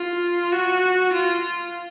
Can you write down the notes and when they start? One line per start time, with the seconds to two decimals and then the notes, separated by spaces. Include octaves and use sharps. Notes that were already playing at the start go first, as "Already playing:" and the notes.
Already playing: F4
0.53 F#4
1.13 F4